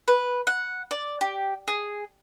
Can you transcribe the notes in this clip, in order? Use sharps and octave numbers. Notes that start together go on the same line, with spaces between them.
B4
F#5
D5
G4
G#4